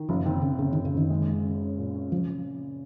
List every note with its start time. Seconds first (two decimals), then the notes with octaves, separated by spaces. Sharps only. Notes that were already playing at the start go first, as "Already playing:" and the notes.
Already playing: D#3
0.09 F#1 F3
0.26 D#3 C4
0.42 F#1 C#3
0.59 F#2 C#3
0.73 D#3
0.76 F#1
0.85 C#3
0.94 F#1 D#3
1.10 G#3
1.27 G#3
1.44 C#4
1.61 C#4
1.77 A#2
1.95 C#4
2.12 C#3 F3